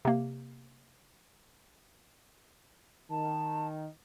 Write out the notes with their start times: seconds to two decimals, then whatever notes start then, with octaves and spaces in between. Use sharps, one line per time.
0.05 C3 A#3
3.10 D#3 A5